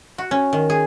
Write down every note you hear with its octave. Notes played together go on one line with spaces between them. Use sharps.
F#4
C#4
D#3
G#4